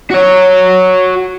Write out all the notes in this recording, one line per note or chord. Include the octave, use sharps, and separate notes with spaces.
F#4 C#5